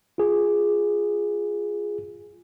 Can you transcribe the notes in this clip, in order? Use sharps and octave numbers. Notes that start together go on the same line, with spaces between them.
F4 G#4